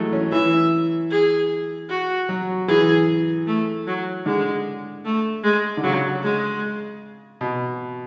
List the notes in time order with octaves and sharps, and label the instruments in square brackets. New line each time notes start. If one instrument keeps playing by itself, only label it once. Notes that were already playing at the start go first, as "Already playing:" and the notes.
Already playing: [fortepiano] E3 F#3 G#3 A3
C#4
[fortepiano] E3 [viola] E5
[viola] G#4
F#4
[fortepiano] F#3
[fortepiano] E3 [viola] G#4
[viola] A3
F#3
[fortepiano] D3 [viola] G#3
[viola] A3
G#3
[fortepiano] D3
[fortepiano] C#3 [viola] F#3
[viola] G#3
[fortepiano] B2